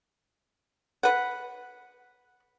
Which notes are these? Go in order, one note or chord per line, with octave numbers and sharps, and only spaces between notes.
B4 F#5